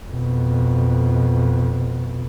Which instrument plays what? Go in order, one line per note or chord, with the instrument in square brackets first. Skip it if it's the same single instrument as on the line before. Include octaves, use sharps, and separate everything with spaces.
[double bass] F2 B2